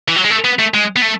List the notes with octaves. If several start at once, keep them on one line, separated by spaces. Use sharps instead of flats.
E3
F#3
G#3
A3
B3
A3
G#3
B3
A3